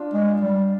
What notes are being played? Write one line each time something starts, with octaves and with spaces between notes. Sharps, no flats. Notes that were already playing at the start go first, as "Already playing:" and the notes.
Already playing: D4 F4
G#3
G3